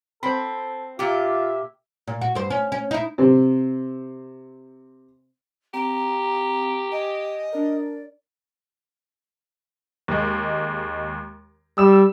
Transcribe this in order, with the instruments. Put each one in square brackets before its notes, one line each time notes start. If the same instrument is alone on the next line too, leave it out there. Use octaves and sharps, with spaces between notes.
[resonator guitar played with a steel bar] C4 [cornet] A4 [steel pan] C5 B5
[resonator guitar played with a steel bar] A#2 G4 [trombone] F4 [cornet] E5
[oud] A#2
F#4
G2 C5
C#4
C#4
D#4 E4
[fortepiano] C3 C4
[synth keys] C4 [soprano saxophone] G4 [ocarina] A#5
[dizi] D#5 [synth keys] G#5
[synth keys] D4 A#4 [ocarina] D5
[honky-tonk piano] D#2 G#3
[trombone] G3 [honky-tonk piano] E6 E7